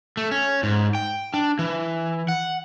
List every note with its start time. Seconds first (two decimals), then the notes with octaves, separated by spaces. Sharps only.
0.17 A3
0.31 C#4
0.63 G#2
0.95 G5
1.34 D4
1.59 E3
2.28 F#5